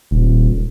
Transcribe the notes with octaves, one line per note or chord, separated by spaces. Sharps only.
D#1